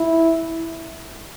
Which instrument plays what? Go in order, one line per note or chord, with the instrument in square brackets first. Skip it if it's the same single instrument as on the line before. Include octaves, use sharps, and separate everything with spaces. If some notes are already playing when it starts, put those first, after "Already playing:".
Already playing: [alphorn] E4